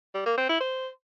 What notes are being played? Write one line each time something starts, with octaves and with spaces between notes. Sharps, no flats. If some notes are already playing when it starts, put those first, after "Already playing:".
G3
A#3
C4
E4
C5